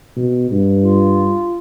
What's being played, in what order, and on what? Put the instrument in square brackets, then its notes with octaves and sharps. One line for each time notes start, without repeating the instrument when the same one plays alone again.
[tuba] B2
G2
[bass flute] F4